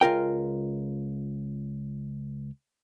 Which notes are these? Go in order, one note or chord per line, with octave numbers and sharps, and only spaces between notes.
C#2 F4 A#4 G5